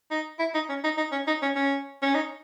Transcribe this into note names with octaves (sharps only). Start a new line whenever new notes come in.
D#4
E4
D#4
C#4
D#4
D#4
C#4
D#4
C#4
C#4
C#4
D#4